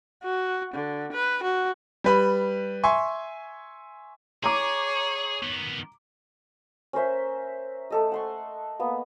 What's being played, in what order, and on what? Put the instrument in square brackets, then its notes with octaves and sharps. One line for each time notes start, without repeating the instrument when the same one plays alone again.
[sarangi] F#4
D3
B4
F#4
[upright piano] G3 B4 B5
E5 G#5 C6 C#6
[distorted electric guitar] G#4 [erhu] C#5 [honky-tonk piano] A#5 D6
[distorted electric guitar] D#3 B3
[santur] C#4 A#4 C5 E5
A3 A4 D#5
F#5 C6 C#6
A#3 B3